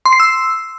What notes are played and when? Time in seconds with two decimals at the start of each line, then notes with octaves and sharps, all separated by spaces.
0.06 C6
0.13 C7
0.20 E6